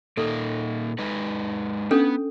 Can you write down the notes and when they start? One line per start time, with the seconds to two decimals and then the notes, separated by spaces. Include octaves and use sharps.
0.17 A#2 A#3 D#4 A4
0.99 G#3 D#4 B4
1.91 B3 C#4 D4 A4